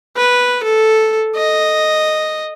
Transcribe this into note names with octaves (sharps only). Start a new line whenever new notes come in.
B4
A4
D#5